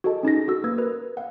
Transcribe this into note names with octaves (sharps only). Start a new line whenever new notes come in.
F#4 G#4 A4 D#5 A5
C#4 D#4 G#4 A#6
F#4 A4 E6
A#3 B4 D#6 E6 G#6
A#4 B4
F5 F#5